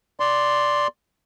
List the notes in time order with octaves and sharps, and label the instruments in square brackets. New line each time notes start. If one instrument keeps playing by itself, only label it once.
[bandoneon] D5 C6